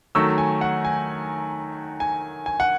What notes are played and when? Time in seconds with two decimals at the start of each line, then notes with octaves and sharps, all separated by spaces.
0.15 D#3 F#3 A3 C#6 E6
0.38 G#5
0.61 F#5
0.85 G#5
2.00 G#5
2.46 G#5
2.60 F#5